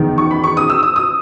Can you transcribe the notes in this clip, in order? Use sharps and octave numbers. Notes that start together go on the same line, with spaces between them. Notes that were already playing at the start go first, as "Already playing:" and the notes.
Already playing: E2 D#3
C#6
B5
C#6
D#6
E6
D#6
D#6